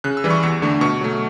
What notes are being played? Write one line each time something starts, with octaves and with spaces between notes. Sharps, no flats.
C#3 F#6
E6
E3 G3
C#6
E2 C#6
D3 A3
B2 C#6
F#3 A3